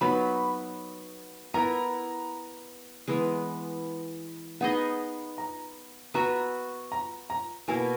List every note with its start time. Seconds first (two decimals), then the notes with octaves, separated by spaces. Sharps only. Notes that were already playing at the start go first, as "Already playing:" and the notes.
0.01 F#3 B3 D#4 B5
1.54 B3 E4 A#4 A#5
3.08 E3 G#3 B3
4.61 B3 D#4 G#4 D#5 F#5
5.38 A#5
6.14 B3 F#4 B4 E5 A#5
6.92 A#5
7.30 A#5
7.68 B2 A#3 E4 A#4 G#5